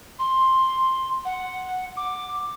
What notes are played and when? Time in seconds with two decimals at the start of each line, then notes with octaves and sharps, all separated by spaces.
0.19 C6
1.25 F#5
1.97 D6